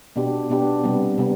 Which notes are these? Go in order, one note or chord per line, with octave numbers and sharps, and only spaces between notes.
B2 B3 D4 G4
B2 B3 D4 G4
C3 G3 B3
C3 G3 B3